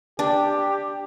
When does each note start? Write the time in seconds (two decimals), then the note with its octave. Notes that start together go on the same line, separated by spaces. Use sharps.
0.19 D4 G4